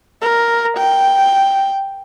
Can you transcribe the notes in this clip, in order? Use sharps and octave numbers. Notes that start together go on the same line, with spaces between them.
A#4
G5